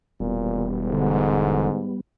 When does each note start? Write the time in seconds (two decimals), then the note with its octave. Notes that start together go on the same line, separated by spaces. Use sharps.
0.20 E1 A#2 G3 B3
0.89 G#2 D3